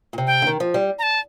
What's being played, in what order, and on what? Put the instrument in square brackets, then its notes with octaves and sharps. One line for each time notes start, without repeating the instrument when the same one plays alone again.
[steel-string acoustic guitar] A#2
C3
[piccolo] G5
[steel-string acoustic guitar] D3
D#3
F3
G3
[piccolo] A#5
A5